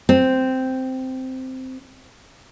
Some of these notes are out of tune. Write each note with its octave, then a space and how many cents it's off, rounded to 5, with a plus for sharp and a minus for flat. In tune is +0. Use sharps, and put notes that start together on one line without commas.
C4 -10